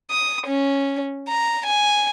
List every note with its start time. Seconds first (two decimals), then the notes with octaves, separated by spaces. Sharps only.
0.11 D#6
0.46 C#4
1.29 A#5
1.66 G#5